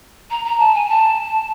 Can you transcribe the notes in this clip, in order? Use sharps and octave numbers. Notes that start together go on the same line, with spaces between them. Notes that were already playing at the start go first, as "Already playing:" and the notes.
A#5
A#5
A5
G#5
A5